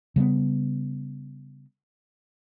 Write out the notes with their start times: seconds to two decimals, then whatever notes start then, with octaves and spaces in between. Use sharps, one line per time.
0.16 C#3 G3 G#3 B3